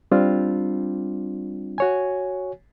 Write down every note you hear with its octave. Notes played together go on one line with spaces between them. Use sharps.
G3 C4 D4 F4
F#4 C#5 G#5